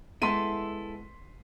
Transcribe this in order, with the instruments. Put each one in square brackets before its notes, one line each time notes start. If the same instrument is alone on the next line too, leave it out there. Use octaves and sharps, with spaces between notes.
[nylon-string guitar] G#3 B3 [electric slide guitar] E4 A4 [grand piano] C6 B6 D#7